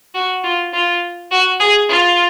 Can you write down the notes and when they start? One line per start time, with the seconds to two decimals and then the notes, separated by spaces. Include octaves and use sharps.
0.15 F#4
0.44 F4
0.73 F4
1.31 F#4
1.60 G#4
1.89 F4